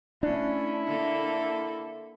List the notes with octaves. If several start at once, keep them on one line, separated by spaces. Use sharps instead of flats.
A3 C#4 D4 E4
D3 A#3 A4